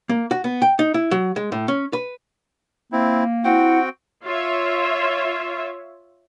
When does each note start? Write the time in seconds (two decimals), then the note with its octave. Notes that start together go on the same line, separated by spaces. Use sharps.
0.09 A#3
0.31 F#4
0.44 B3
0.62 G5
0.79 D#4
0.94 E4
1.11 F#3
1.36 G#3
1.52 A2
1.68 C#4
1.93 B4
2.92 A#3 C4 E4
3.44 C4 E4 F#4 F#5 G5
4.24 F4 C#5 E5